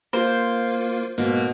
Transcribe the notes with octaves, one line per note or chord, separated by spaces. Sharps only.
A#3 F4 C5
G#2 B2 A#3